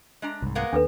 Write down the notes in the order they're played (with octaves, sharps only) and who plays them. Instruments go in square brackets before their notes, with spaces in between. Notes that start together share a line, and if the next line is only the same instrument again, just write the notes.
[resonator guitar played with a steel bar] G#3 D4 A#5
[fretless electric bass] C2 G#2
[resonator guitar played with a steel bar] G#3 A#3 B3
[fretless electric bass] D#2 [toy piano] D4 A4 B4